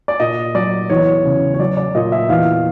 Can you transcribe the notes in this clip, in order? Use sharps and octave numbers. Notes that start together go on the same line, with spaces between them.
D5
A#2 D#5
F#3 D5
E2 C#5
C#3
C#5
F#3 D5
D5
A#2 D#5
E5
E2 F5